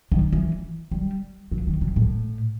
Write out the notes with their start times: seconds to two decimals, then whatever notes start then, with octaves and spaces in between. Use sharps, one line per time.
0.12 D#3
0.33 E3
0.91 G3
1.52 F#3
1.67 D#3
1.81 C3
1.96 A2